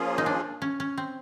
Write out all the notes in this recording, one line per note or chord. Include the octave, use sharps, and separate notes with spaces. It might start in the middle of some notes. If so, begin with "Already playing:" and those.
Already playing: F3 A#3 C#4 F4 G#4
D#4
D4
C#4
C#4
C4